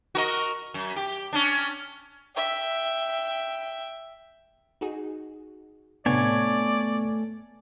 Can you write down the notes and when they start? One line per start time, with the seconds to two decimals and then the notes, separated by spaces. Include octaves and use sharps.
0.15 F#4 A#4 D#5
0.74 F#2
0.96 G4
1.33 C#4 D4
2.35 E5 G5
4.81 D#4 F#4 G#4
6.06 A2 C3 A3 B3 D4 C#5 D5 G#5